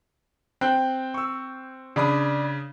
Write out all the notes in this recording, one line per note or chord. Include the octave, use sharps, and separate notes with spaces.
C4 G5 F#6
C#6 E6
C#3 D4 D5 B5 D#6